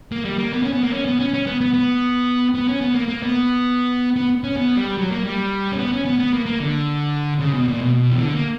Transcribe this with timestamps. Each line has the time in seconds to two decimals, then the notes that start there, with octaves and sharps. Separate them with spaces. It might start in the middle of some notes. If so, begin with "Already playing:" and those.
0.12 A#3
0.25 G3
0.38 A#3
0.53 B3
0.63 C#4
0.73 B3
0.83 A#3
0.92 C#4
1.06 B3
1.20 C#4
1.34 C#4
1.46 B3
1.61 B3
1.74 B3
2.55 B3
2.68 C#4
2.81 B3
2.95 A#3
3.08 A#3
3.22 B3
4.16 B3
4.44 C#4
4.57 B3
4.77 G3
4.97 F#3
5.10 A#3
5.24 G3
5.72 C#4
5.78 B3
5.92 C#4
6.05 B3
6.19 B3
6.33 A#3
6.46 A#3
6.60 D3
7.40 C#3
7.54 B2
7.68 A#2
7.81 B2
8.11 E3
8.21 D3
8.34 A#3